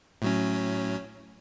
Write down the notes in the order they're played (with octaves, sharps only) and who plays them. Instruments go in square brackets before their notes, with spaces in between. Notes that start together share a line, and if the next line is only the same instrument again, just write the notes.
[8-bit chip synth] A2 F#3 C#4